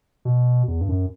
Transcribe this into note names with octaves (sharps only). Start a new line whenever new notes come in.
B2
E2
G2
F#2